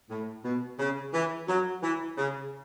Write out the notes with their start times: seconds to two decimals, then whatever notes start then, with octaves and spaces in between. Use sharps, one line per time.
0.10 A2
0.45 B2
0.79 C#3
1.13 E3
1.48 F#3
1.83 E3
2.18 C#3